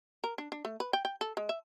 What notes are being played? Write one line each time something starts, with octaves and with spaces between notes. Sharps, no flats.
A#4
D4
D4
A3
B4
G5
G5
A4
G#3
E5